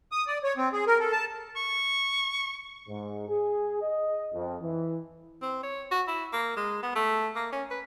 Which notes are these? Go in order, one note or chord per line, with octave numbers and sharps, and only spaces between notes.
D#6
D5
C#5
C4
G#4
A#4
A4
A5
C#6
G#2
G#4
D#5
F2
E3
C4
C#5
F#4
E4
A#3
G#3
B3
A3
A#3
C#4
B4